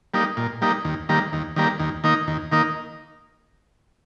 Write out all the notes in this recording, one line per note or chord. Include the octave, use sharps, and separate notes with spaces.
G3 A#3 D#4
A#2
G3 A#3 D#4
D#2
D#3 G3 A#3
D#2
D#3 G3 A#3
D#2
D#3 A#3 D#4
D#2
D#3 A#3 D#4